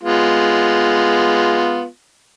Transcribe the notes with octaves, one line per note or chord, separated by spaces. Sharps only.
G#3 B3 F4